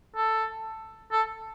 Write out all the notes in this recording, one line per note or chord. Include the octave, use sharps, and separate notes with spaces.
A4
A4